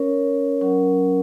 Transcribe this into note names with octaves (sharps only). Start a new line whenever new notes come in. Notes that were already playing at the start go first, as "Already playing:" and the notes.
Already playing: C#4 A#4 C#5
F#3 C#4 A#4 F#5